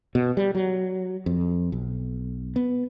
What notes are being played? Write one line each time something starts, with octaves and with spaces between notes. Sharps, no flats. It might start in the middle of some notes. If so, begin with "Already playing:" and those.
B2
G3
F#3
F2
B1
B3